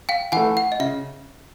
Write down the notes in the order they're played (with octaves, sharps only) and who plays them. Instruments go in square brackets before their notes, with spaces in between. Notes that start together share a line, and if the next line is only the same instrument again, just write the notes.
[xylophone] F5 G5
[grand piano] E3 A3 [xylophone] F#5 G#5
[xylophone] F#5
D#5
[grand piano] C#3 [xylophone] E5